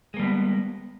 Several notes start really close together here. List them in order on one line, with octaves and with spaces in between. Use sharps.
G#3 A#3 G3 B3